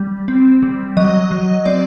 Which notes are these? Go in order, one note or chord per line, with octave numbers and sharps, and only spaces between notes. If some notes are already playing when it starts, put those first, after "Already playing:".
Already playing: G3
C4
G3
F#3 D#5
F#3
C4 D5